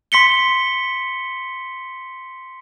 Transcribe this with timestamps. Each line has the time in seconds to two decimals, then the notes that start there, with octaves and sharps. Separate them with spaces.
0.12 C6 B6 C#7 G7